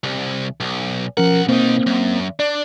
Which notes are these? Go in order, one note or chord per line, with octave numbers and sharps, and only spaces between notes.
C2
B1
B1 F3 C#4 A#4 F#5
B2 A#3 C4 D#4 C5
F#2
D4 D5